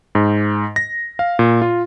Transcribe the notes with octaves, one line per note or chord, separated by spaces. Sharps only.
G#2
A#6
F5
A#2
F4